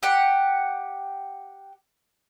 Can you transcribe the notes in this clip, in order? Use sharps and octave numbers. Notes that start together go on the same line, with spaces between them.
G4 F#5